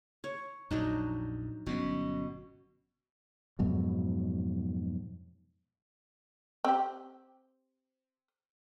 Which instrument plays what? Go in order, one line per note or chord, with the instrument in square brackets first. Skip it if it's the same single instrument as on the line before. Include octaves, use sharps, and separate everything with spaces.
[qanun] C#5
[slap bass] A#1 F2 [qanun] F#3 D4 D#4
[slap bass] G1 F#3 C#4 [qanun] B2
[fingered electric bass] F2 G#2 B2 F#3
[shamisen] C4 G4